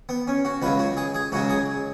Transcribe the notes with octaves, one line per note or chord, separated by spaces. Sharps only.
B3
C#4
F#4
C#2 C#3 F#3 B4
F#4
G#4
G#4
C#2 C#3 F#3 F#4
G#4